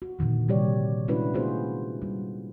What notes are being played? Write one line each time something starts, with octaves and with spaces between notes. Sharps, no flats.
F#4
A#2 D3 D#3 F3
C3 G3 G4 C#5 D5
G#3 C#4 D4 E4 F#4 B4
A#3 B3 F4 F#4 G#4 C5
G3